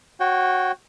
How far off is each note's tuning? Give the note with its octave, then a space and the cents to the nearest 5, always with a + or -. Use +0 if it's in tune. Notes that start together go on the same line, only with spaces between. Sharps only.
F#4 +0 C#5 -30 G5 -15